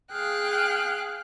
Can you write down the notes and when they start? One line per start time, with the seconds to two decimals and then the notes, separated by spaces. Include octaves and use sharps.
0.12 G#4 F5 G5 F#6